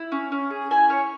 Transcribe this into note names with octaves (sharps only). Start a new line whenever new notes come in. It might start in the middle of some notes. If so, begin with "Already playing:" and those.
Already playing: E4
C#4
C#4
G#4
E4 G#5
C#4 C#5